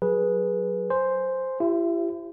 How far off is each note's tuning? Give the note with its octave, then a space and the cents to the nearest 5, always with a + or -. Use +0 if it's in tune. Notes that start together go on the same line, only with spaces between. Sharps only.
F#3 +0 G#4 +0 B4 -15
C5 +0 G#5 +0 C6 +0
E4 +45 G4 +0 E5 +25